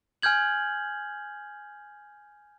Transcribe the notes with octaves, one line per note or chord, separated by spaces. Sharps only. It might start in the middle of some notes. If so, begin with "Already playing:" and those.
G#5 F6 G6 G#6 F#7